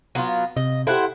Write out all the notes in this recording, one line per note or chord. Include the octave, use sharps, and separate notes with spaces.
F#3 B3 F4
C3 D#5
E4 G4 A4 C5 F#5